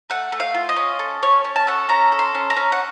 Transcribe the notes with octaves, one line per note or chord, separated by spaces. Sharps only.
A3 F#5
A3
F5
F4
D#5
C#4
A4
C#4 C#5
C#4
A5
A4 F#5
C#4 A#5
A4
C6
C#4
A#5
C#4
F#5